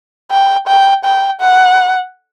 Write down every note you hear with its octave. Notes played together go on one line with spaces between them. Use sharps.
G5
G5
G5
F#5